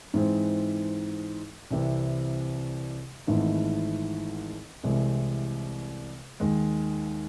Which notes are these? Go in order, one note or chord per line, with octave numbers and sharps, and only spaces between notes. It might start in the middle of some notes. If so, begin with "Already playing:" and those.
G#2 E3 G#3 C4
C2 C3 E3 C4
G#1 G#2 E3 A3
C2 C3 E3 G#3
D#2 D#3 G#3